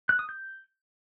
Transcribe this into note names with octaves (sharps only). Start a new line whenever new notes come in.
F#6
D#6
G6